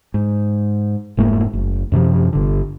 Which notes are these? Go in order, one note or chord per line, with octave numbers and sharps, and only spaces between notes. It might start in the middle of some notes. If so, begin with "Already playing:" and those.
G#2
F1 G#2 A3 A#3
F#1
F#2 C3 D#3 F3
G1 D3